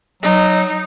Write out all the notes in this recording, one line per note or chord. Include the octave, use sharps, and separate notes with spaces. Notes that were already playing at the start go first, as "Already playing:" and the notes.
F#3 D#4